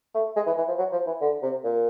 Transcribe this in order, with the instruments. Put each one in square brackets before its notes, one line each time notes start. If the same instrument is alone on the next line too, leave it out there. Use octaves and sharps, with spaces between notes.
[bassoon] A3
G#3
E3
E3
F3
F#3
F3
E3
D3
C3
A#2